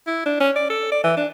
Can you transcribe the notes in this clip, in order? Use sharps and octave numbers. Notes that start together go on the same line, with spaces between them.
E4
D4
C#4
D5
A4
D5
E3
D4